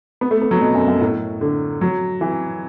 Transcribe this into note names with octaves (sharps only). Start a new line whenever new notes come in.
B3
A3
B3
F#3
B2
F#2
F#2
A2
D3
F#3
E3